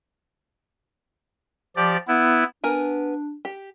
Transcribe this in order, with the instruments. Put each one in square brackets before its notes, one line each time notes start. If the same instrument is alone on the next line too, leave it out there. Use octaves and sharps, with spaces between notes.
[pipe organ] F3 G4 D5
B3 E4
[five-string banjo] B3 A#4 G#5 [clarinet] D4
[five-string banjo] G4